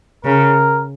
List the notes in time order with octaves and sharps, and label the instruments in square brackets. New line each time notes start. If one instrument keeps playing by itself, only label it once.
[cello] C#3 [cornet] A#4